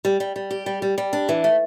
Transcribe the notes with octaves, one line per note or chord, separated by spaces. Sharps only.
G3
G3
G3
G4
G3
G3
G3
D4
E3
A3